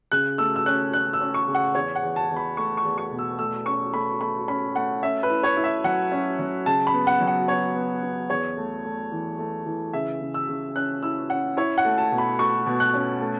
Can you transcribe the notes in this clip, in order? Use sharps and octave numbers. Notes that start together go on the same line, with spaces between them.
C#3 F#6
A3 E6
E6
C#4 F#6
C#4 F#6
E6
C#4
C#6
C#3
F#5
E2 C#5
F#5
E2
A5
E2
B5
A3 C#6
C#6
E2
C#6
B2
E6
A3 E6
C#4 C#6
A3 B5
A3 B5
C#4 B5
A3 F#5
C#4 E5
B4
E4
C#5
E4
E5
F#3 F#5
C#4
F#3
C#3 A5
B5
B3
F#5
F#3
F#5
B3 C#5
B3
B3
E2 C#5
A3
A3
E3
A3
E3
C#3 E5
C#3
E6
C#3
C#4 F#6
E4 E6
C#4 F#5
E4 C#5
F#5
A3
A5
B2
B5
A3 C#6
B2
F#6
C#4
A3